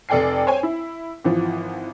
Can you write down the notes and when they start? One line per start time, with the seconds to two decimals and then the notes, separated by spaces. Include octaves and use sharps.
0.09 F1 A4 D5 G5 G#5 C7
0.47 C5 C#5 G5 G#5
0.63 E4
1.24 G#1 E3 F3